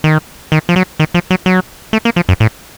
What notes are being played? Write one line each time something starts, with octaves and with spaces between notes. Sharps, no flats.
D#3
D#3
F3
F#3
D#3
F3
F#3
F#3
A3
A#3
F3
F#2
A2